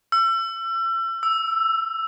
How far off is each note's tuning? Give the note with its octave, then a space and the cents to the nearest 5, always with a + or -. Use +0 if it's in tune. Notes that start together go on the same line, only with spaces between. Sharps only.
E6 +35
E6 +5